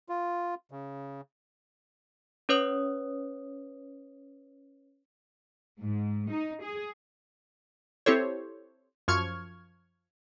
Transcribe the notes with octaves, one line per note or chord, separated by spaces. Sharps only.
F4
C#3
C#4 B4 C#5 D#6
G#2
D#4
G#4
C4 E4 G4 A4 C5 C#5
F#2 F3 C#6 F6 G#6